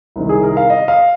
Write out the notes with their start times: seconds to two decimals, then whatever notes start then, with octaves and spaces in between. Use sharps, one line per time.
0.16 C2 C3 D#3
0.29 G#4
0.43 A#4
0.57 F5
0.70 D#5
0.88 F5